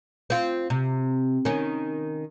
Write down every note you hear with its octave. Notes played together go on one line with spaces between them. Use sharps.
C4 F4
C3
D#3 C#4